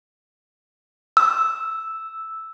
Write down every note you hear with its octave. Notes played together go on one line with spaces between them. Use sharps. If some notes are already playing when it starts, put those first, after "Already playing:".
E6